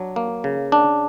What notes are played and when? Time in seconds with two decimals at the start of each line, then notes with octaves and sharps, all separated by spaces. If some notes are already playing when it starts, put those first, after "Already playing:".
Already playing: F#3 D4
0.16 A#3
0.44 C#3
0.72 D4